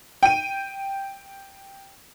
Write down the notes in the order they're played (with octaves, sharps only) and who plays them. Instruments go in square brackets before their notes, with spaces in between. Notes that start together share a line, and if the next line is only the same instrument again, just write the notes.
[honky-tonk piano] G5 D#7